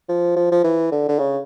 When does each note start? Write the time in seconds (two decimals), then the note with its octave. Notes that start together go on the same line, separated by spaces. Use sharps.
0.09 F3
0.36 F3
0.52 F3
0.64 E3
0.92 D3
1.08 D3
1.19 C#3